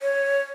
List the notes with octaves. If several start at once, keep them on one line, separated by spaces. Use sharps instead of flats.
C#5